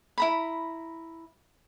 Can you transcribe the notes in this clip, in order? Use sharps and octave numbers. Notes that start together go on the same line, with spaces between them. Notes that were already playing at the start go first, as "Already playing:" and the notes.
E4 A#5 B5